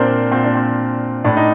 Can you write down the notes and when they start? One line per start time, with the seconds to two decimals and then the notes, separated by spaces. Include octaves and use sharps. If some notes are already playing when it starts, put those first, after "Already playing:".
Already playing: A#2 C4 D4 A#4 C5
0.32 A#2 C4
0.44 D4
0.55 C4
1.24 A2 D4
1.37 D#4